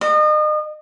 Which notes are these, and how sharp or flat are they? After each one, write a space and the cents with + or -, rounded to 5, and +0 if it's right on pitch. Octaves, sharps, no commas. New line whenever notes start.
D#5 -35